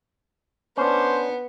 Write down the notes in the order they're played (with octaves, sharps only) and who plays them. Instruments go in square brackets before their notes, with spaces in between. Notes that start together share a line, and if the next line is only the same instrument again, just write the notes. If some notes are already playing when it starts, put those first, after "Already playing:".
[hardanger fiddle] B3 [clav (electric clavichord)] C#4 D4 [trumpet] C5